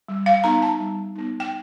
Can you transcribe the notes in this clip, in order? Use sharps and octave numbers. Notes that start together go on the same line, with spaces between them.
G3
F5
B3 D#4 A#5
A5
G3
B3 D#4
G5